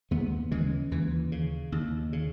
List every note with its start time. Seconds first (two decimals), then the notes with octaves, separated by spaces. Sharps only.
0.11 D#2 G#3 B3
0.51 C#3 E3 G#3
0.91 D#2 E3
1.32 C#3
1.72 D#2
2.13 C#3